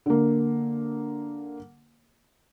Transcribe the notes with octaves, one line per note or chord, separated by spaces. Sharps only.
D3 A#3